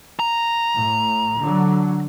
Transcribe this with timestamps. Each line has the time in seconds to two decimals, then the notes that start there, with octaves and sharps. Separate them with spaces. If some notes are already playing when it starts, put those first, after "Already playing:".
0.19 A#5
0.76 A2
1.39 D3 F#3